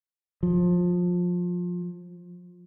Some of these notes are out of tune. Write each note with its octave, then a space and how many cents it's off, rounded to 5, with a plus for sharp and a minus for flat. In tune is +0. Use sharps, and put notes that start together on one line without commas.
F3 +20